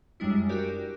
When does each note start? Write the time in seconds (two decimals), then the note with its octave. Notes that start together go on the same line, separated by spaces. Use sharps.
0.20 F#2 G3 G#3 D4 E4
0.49 F#4 G4 A#4 D5